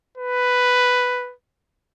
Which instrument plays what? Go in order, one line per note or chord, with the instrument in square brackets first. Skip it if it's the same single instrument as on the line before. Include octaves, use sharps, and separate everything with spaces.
[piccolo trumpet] B4